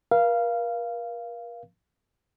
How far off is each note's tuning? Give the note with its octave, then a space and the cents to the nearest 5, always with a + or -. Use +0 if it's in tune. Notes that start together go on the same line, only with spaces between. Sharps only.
A#4 +40 F5 -15